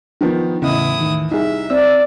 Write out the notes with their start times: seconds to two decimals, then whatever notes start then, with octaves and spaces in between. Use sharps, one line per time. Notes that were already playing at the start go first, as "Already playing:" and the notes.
0.21 D#3 F3 B3
0.62 E2 A2 C#3 E4 D#5 D#6
1.00 D#3
1.31 C2 D#4 G#4 E5
1.70 C4 D5 E6